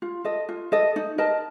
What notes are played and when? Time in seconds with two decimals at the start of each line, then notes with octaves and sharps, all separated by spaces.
0.02 F4
0.25 A4 D#5
0.49 F4
0.72 A4 D#5
0.96 D#4
1.18 A#4 D#5 A5